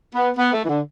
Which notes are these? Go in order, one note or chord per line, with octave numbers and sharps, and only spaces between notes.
B3
B3
A3
E3
D3